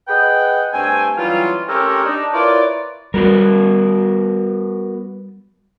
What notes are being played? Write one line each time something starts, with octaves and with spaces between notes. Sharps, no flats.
G#4 B4 D#5 F#5 G5
G2 A3 C4 G5 G#5
E3 F#3 G3 C#4 F4
A3 C4 C#4 G4 A4 A#4
D4 D#4
E4 F4 A#4 B4 C#5 D5
G3 B3 F#4 A#4